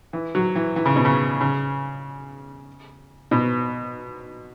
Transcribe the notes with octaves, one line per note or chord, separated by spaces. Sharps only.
E3
F#3
E3
E3
C#3
B2
C#3
C#3
B2